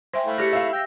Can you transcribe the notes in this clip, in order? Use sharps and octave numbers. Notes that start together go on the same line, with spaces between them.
C5 E5 G5 G#5 C6
A3 E4 F5 F6
G4 G#4 A#6 C#7
E5 F5
G5 E6 A#6